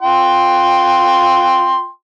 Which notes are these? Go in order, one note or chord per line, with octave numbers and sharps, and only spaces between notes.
F4 G5 C6